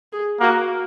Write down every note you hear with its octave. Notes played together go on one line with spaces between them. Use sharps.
G#4
A#3 F#4